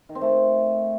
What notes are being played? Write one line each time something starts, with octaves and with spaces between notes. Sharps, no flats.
D#3
C4
A3